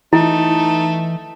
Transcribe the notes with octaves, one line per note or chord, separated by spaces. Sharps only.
E3 A3 D#4 E4